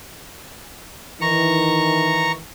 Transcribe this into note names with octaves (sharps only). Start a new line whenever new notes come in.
D#3 E3 A#5 C#6